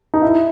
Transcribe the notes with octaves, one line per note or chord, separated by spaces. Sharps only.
D#4
E4